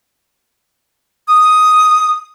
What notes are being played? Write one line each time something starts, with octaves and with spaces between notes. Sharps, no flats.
D#6